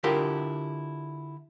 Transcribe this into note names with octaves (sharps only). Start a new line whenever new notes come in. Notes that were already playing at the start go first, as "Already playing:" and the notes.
D3 E4 F4 G4 A#4